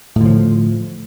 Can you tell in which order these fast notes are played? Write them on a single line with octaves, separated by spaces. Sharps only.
A2 D3 F3